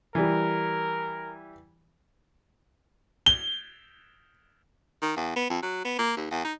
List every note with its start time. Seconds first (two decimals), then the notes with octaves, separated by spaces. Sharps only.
0.15 E3 G3 A#4
3.26 G7
5.02 D#3
5.17 E2
5.36 B3
5.50 F2
5.62 F#3
5.85 B3
5.99 A#3
6.17 D#2
6.31 E2
6.44 D#4